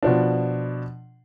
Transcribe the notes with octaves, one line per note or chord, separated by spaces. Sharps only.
B2 F3 D4